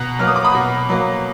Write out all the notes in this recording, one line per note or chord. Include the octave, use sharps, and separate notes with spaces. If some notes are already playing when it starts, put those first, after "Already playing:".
Already playing: B2 F#5 A#5
F#3 A#3 F6
D#6
D6
B5 D#6
B2
F#3 A#3